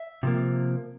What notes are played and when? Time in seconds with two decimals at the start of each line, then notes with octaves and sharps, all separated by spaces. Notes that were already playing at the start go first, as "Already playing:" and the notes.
Already playing: E5
0.23 C3 F3 A#3